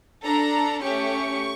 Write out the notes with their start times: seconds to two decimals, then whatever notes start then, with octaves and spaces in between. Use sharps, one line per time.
0.24 D4 A4 A#5
0.81 A3 C#4 G4 C#6